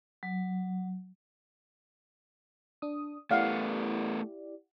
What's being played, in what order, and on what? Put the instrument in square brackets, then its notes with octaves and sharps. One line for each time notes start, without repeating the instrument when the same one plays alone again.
[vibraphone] F#3
[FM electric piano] D4 D#6
[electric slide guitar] A3 B3 [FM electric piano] E4 G4 D5 [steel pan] F5 F#5